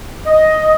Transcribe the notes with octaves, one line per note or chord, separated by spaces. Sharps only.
D#5